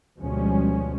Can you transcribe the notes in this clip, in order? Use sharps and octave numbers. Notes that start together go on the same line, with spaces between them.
D2 B2 F3 G3 G#3 C#4